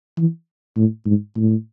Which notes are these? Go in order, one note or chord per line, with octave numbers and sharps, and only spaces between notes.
E3
A2
G#2
A2